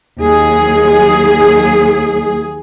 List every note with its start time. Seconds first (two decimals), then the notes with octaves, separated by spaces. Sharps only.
0.21 D#2 F#3 G#4